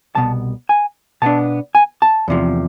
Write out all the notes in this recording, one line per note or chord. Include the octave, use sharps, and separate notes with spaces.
C2 B2 B3 A5
G#5
B2 B3 D4 A5
G#5
A5
E2 C3 F3